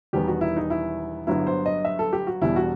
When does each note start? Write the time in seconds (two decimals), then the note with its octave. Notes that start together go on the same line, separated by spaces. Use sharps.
0.13 E1 E2 D#3 G3 B3 G4
0.27 F#4
0.41 E4
0.57 D#4
0.70 E4
1.27 G1 G2 F#3 B3 E4
1.47 C5
1.66 D#5
1.85 E5
1.99 A4
2.13 G4
2.27 F#4
2.42 E1 E2 B2 G3 E4
2.56 F#4